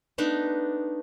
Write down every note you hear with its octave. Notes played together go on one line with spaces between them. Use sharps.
A3 B3 D4 D#4